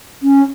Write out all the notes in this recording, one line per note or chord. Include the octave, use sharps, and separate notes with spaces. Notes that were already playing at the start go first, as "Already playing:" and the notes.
C#4